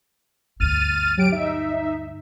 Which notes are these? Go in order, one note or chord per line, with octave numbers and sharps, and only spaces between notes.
D2 G2 F6 A6 D#7
F#3 G4 D7
D#4 E5